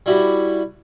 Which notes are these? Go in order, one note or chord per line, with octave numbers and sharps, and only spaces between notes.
G3 E4 F#4 G4